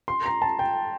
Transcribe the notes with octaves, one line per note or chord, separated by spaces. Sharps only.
C6
A#5
A5
G5